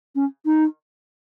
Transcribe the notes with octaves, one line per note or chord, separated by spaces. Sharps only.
C#4
D#4